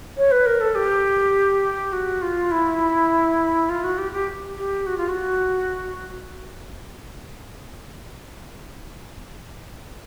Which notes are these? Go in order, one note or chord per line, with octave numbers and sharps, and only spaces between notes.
C#5
B4
A#4
A4
G4
F#4
F4
E4
F4
F#4
G4
G4
G4
F#4
F4
F#4